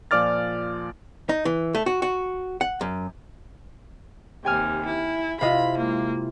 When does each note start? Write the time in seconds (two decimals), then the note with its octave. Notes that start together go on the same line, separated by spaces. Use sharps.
0.11 A#2 F3 D5 D6 F6 A6
1.29 D#4
1.45 E3
1.75 A3
1.86 F#4
2.02 F#4
2.61 F#5
2.81 F#2
4.45 D#2 C3 G5 G#5 F6
4.86 E4
5.41 C3 E4 F4 D#5 F5 B5
5.78 G#3 A#3